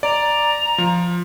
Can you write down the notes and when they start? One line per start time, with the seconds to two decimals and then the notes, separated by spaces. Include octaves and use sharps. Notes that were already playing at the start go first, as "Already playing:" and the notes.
0.03 D5 A#5
0.78 F3